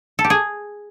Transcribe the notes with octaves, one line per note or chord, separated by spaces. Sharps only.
A4
G4
G#4